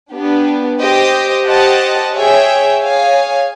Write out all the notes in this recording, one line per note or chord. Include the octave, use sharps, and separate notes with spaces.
B3 D4 G4
G4 C5 D#5 G5
G4 C5 D#5 F#5 A5
G#4 C#5 E5 G5
G#4 C#5 F5 G#5